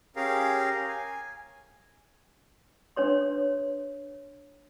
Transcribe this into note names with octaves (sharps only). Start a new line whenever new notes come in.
C#4 G4 G#4 A#4 F5
G#5
D4 B4 C#5 C6